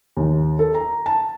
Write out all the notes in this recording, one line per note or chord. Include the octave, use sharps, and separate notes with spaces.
D#2
A4
A#5
A5